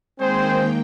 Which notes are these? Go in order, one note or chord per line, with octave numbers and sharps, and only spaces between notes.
D#3 G#3 A#3 C4 G#4 C5 G5